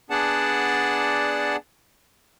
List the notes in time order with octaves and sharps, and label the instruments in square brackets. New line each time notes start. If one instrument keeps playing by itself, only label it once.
[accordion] B3 D4 G#4 D5 F#5 A5